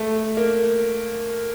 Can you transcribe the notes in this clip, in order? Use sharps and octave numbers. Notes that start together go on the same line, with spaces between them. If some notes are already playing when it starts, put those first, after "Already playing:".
Already playing: A3
A#3